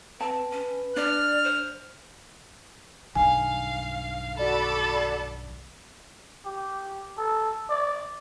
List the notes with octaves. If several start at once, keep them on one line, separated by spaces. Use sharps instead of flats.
C4 B4 A5
C#4
D4 D5 F6
C5
B1 G2 D#3 F5 G#5
F#4 A4 D5 B5
G4
A4
D5